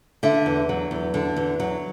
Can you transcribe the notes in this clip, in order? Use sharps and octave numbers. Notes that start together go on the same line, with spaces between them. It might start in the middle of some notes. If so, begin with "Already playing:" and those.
D3 E5
E2
F#3
E2
D3
E2
F#3